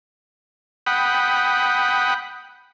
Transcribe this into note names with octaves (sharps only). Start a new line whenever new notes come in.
F#5 G5 B5 D#6